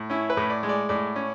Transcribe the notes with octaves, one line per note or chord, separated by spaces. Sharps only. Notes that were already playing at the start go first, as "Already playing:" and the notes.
Already playing: A2
C#4 E4
B4
A2
D5
G#3
D5
A2 D5
C#4